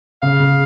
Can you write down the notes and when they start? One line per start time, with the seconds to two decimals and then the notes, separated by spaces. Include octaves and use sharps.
0.22 C#3 F5
0.40 C#3